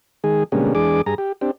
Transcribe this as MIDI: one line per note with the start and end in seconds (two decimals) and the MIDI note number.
0.24 0.44 51
0.24 0.44 56
0.24 0.44 68
0.52 0.73 47
0.52 0.73 50
0.52 0.73 55
0.52 0.73 56
0.52 0.73 58
0.52 0.73 61
0.75 1.02 40
0.75 1.02 56
0.75 1.02 62
0.75 1.02 68
0.75 1.02 86
1.06 1.15 43
1.06 1.15 68
1.06 1.15 82
1.18 1.32 67
1.41 1.51 60
1.41 1.51 62
1.41 1.51 67